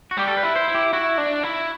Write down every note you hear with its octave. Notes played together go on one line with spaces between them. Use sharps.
F#4
G3 G4
A4
B4
E4
C5
E4
G4
E4 F#4
D4
E4